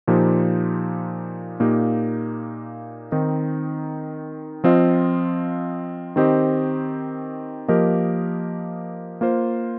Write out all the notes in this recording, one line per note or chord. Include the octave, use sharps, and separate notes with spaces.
A#2 F3 D#4 G4 C5
A#2 A#3 D#4 G4
D#3 C4 D#4
F3 C4 F4 D#5
D#3 C4 G4 C5 D#5
F3 A#3 G4 A#4 D#5
A#3 F4 C5